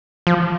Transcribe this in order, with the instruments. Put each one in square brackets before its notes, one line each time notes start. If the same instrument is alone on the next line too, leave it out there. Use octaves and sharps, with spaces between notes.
[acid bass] F3